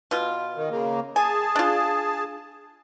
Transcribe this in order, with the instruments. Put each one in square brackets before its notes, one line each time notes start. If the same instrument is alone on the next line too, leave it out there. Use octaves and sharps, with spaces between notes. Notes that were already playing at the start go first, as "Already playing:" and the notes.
[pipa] B2 F4
[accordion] D#3
C#3 A#3
[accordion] G#4 A5 [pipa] G#5
[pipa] D4 F4